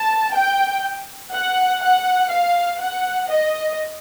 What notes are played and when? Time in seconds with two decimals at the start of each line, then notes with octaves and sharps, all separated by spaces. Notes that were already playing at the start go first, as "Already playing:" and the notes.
Already playing: A5
0.34 G5
1.33 F#5
1.82 F#5
2.31 F5
2.81 F#5
3.30 D#5